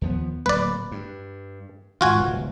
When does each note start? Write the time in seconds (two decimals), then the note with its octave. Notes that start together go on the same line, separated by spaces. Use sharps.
0.01 D#2 F3 B3
0.46 D1 F#3 A#3 B4 D5
0.92 G2
2.01 G#2 D#3 F4 F#4 G#5
2.17 D1 C2 E3